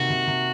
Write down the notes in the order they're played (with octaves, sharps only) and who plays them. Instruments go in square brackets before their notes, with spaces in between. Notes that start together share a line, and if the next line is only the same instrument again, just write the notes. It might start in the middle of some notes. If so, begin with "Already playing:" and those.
Already playing: [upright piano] C3 D#3 A#3 [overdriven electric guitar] F#4
[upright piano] C3
C3